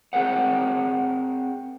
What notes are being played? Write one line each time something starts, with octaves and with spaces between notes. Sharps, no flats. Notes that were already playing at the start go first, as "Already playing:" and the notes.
C4 G#4 A#4 C5 F#5